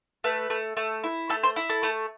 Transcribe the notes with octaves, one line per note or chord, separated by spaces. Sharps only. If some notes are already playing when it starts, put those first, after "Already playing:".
A3 B4
A3
A3
E4
A3 A4
C5
E4
A4
A3